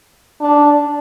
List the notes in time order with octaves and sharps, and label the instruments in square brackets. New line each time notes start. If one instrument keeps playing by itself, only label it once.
[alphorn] D4